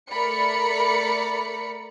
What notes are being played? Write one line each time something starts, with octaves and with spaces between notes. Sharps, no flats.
A3 A#4 D5 B5 C#7